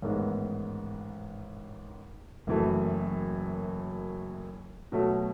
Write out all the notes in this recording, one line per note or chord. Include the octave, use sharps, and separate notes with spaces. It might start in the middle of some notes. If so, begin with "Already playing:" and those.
A1 G#2 D#3 G#3 B3
F#1 F#2 E3 A3
B2 F#3 A3